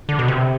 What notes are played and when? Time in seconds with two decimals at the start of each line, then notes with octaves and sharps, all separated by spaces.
0.09 D3
0.19 B2
0.28 C3